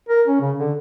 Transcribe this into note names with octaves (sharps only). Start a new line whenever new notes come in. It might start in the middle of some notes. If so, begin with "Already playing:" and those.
A#4
C#4
C#3
D3